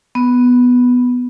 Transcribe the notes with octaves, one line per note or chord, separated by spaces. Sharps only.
B3